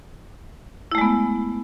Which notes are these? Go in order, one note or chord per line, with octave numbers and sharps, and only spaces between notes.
G#3 A3 B3 E4